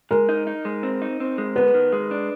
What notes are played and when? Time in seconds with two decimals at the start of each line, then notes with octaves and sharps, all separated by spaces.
0.11 G#3 A#4
0.29 D#4
0.47 D#4
0.65 G#3
0.83 C4
1.02 D#4
1.20 C4
1.38 G#3
1.56 B3 B4
1.74 D#3
1.92 G#3
2.11 D4